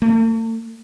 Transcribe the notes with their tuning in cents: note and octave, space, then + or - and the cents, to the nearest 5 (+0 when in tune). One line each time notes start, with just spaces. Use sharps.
A3 +45